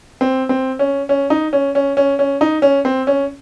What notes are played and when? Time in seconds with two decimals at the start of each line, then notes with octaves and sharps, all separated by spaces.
0.21 C4
0.49 C4
0.79 C#4
1.09 C#4
1.30 D#4
1.53 C#4
1.75 C#4
1.97 C#4
2.19 C#4
2.41 D#4
2.62 C#4
2.85 C4
3.07 C#4